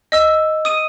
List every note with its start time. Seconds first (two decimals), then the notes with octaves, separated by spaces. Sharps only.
0.12 D#5 E6
0.65 D#6 D#7